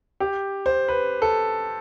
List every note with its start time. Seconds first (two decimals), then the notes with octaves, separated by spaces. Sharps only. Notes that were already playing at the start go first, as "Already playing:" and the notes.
0.20 G4
0.66 C5
0.88 B4
1.22 A4